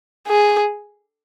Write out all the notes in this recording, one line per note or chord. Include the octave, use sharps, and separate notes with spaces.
G#4